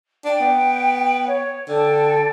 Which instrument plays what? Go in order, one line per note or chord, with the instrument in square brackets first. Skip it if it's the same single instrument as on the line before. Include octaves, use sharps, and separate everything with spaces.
[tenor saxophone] D4 [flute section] G5
[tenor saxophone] B3
[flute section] C#5
[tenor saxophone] D3 [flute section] A4 G5